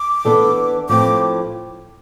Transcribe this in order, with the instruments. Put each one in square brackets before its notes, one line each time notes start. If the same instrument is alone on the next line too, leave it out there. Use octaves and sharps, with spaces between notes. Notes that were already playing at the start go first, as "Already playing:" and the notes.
Already playing: [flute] D6
[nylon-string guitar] E3 B3 D4 A4
[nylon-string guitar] A2 F3 C4 [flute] D6